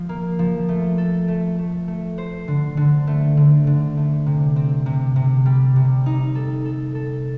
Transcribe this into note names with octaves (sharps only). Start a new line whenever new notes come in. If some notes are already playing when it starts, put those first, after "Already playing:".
Already playing: F3
A#3
F3
A3
A4
A3
A3
A3
C5
D3
D3
A3
D3
D3
A3
C3
C4
C3
C3
G3
C3
D#4
A4
A4
A4